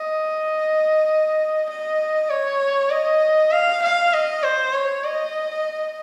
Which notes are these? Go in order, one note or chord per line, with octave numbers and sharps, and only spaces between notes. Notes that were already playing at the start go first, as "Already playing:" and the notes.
Already playing: D#5
D#5
C#5
D#5
F5
F5
D#5
C5
C#5
D#5